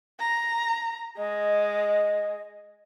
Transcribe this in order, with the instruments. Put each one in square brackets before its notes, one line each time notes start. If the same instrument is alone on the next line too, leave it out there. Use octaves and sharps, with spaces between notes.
[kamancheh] A#5
[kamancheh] G#3 [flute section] D#5